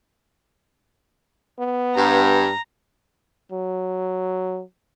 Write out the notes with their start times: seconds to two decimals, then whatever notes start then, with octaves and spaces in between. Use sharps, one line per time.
1.59 B3
1.96 G2 A#5
3.52 F#3